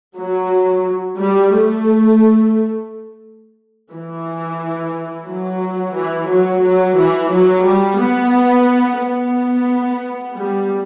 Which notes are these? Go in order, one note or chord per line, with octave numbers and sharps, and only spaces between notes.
F#3
G3
A3
E3
F#3
E3
F#3
F#3
E3
F#3
G3
B3
B3
G3